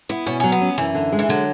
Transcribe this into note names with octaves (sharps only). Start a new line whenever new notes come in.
B3 E4
B2 C#4
F#3 C#4
B3
C#4
F#2 E3
D3
G#3
E3
D3 F#3